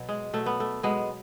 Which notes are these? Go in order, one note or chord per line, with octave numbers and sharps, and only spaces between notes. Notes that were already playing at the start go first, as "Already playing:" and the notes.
Already playing: B2 F#3
G#3
B2 F#3 A3
B3
A3
B2 F#3 G#3 B3